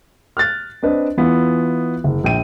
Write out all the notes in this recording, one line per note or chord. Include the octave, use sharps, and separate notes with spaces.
F6 F#6 A6
C4 D4 B4 D#5
E3 B3 E4 F4
F#1
A#1 G5 D#7